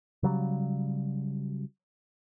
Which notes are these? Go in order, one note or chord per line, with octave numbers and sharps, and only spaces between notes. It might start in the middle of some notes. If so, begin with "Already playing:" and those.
C#3 F#3 G3